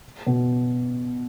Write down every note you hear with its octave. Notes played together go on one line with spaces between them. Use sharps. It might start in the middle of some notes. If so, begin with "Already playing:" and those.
B2